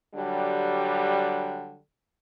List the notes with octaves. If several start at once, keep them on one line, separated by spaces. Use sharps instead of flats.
D3 F#3 G3